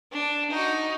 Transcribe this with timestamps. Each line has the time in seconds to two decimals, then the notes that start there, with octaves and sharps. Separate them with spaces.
0.12 D4
0.50 D#4 F#4